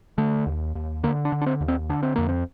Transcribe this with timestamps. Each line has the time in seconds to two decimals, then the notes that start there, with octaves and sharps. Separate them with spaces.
0.18 D3 A3
0.46 D#2
0.75 D#2
1.03 D3 A#3
1.25 D4
1.32 D3
1.42 D4
1.46 C4
1.61 D#2
1.68 C4
1.89 D3 D4
2.03 C4
2.16 F2 A#3
2.29 C4